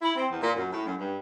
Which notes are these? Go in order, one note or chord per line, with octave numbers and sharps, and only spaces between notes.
E4
C4
E2
A#2
F#2
A2
F#2
G2